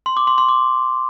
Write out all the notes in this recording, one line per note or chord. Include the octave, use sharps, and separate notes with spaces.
C6
D6
C6
C6
D6